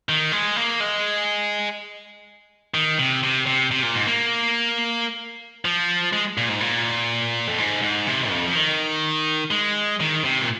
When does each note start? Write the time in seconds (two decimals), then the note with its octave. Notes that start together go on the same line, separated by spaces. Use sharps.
0.09 D#3
0.32 G#3
0.56 A#3
0.80 G#3
2.74 D#3
2.99 C3
3.23 C3
3.47 C3
3.71 C3
3.82 A#2
3.95 G#2
4.07 A#3
5.65 F3
6.13 G#3
6.38 A#2
6.49 G#2
6.61 A#2
7.48 F2
7.58 G#2
7.82 G#2
8.07 C3
8.30 F2
8.47 F3
8.55 D#3
9.51 G#3
10.00 D#3
10.24 C3
10.42 A#2